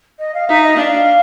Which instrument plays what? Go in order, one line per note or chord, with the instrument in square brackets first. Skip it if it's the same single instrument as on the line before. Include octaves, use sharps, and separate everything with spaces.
[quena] D#5
F5
[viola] D#4 [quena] E5
[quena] D#5
[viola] D4 [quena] F5